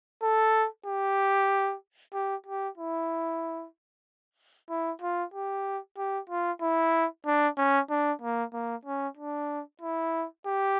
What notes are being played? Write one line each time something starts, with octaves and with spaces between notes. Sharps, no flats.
A4
G4
G4
G4
E4
E4
F4
G4
G4
F4
E4
D4
C#4
D4
A#3
A#3
C#4
D4
E4
G4